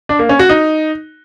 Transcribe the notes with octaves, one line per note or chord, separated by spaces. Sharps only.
D4
A#3
C#4
F#4
D#4